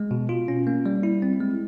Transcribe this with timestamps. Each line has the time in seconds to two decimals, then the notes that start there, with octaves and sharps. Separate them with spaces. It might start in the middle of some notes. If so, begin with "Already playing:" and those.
Already playing: G#3
0.11 B2
0.29 F4
0.48 C#4
0.67 A#3
0.86 G3
1.03 E4
1.22 C4
1.41 G#3